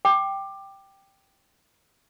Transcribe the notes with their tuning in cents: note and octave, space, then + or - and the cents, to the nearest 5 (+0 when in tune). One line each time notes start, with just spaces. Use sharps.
G5 +0 D6 +20